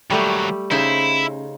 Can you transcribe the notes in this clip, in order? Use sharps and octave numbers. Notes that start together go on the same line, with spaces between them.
D#2 F#3 G3 A3 G4
C#3 D#4 E4 C5